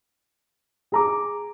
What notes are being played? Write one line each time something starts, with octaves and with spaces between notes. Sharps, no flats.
G#4 A#5 D6